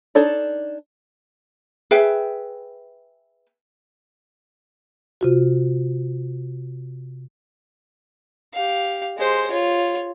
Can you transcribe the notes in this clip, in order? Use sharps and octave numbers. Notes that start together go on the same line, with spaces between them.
D4 D#4 A4 C#5 D5
G#4 B4 E5 G5
C3 F4 F#4
G4 F5
G#3 C5
F4 C#5